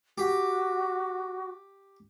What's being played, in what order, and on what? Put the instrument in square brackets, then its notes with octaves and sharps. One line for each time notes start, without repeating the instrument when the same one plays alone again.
[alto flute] F#4 [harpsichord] G4